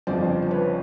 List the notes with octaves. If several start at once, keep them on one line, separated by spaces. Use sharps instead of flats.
G1 F2 C#3 F3 C5 D5
C5
B4 C#5